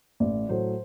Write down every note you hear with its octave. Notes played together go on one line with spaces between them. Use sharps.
A1 D5
A2 F#3 C5